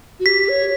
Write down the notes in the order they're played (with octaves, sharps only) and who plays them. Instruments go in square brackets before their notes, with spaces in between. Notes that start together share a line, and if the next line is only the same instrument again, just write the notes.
[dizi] F#4
[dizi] G4 [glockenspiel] B6
[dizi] C#5